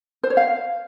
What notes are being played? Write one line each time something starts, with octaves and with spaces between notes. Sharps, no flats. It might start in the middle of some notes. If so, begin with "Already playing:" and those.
C5
C#5
F5